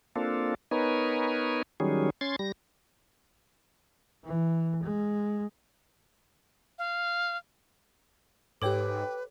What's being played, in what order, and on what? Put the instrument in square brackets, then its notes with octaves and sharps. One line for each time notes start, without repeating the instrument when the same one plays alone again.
[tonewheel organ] A#3 C4 D4 F4 A4
B3 D#4 A#4 B4 C#5 G#5
D#3 F#3 G3 C#4 G#4
C#4 C6 G#6 A6
G3 A#6
[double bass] E3
G#3
[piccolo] F5
[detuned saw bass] G#2 [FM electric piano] G4 G5 D6 [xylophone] A4 C#5 [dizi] B4